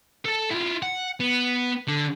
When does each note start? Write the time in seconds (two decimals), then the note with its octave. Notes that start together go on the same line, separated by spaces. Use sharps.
0.25 A4 A5
0.50 E4 F4
0.83 F#5
1.20 B3
1.87 D3